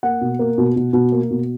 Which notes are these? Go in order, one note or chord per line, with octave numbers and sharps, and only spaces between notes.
A#3 F#5
B2
A#3
B2
B2
B2
A#3
B2